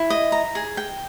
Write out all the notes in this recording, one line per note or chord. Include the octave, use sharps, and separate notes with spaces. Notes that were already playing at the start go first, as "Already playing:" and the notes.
Already playing: E4
D#5
A#5
G#4
G5